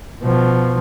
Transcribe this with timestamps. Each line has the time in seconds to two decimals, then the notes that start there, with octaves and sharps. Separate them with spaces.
0.23 B2 F3